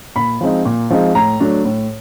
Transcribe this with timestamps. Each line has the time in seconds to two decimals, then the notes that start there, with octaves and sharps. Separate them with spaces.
0.16 A#2 B5
0.41 F3 G#3 C4 D#4
0.65 A#2
0.90 F3 G#3 C4 D#4
1.15 A2 A#5
1.40 F#3 A3 D4
1.65 A2